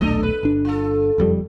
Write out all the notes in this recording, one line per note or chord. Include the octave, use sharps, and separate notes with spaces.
D#1 B1 A3 D4 A4 D#5
B4
G1 D4
F4 A4
F#1 F2 G3